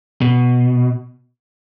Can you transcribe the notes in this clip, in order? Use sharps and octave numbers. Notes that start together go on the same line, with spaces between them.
B2